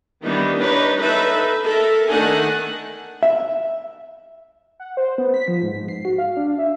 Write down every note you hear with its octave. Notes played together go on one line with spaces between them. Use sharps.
D#3 E3 G3 B3 D4 D#4
D4 D#4 B4 C#5
D#4 A4 B4 E5
A4 A#4 E5
D#3 A3 D4 D#4 F#5 G#5
E5
F#5
C5
B3
B6
F3
G#2
G#2
C7
F#4
F5
D4
E5